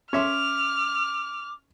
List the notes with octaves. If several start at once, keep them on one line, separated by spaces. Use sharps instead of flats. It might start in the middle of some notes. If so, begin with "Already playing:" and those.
C#4 E5 C6 D6 F6